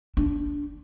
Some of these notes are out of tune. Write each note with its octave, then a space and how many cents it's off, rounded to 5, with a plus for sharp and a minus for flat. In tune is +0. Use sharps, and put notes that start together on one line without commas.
D4 -15